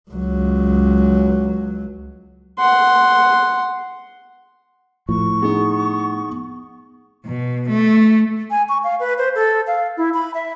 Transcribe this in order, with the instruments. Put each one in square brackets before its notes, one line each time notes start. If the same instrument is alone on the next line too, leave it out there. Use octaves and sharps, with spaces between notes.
[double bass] C#2 F#3
[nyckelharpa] F#5 C6
[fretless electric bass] A2 F3 [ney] C#6
[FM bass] B3 [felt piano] D#4 G#4
[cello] B2
A3
[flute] G#5
C#6
F5
B4
C5
A4
F5
E4
B5
E5